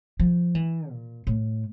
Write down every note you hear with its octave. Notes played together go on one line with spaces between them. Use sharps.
F3
E3
A#2
A2